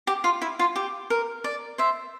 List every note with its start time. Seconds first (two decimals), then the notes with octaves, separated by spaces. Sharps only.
0.07 G4
0.24 F4
0.42 E4
0.59 F4
0.76 G4
1.10 A#4
1.44 D5
1.78 C5 E5